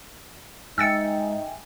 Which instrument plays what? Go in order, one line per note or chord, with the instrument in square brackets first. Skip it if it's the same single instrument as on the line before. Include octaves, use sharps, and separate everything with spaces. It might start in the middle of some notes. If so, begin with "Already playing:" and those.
[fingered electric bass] G#2 [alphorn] D#4 [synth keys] E5 G5 G#5 [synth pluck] E6 A6 C#7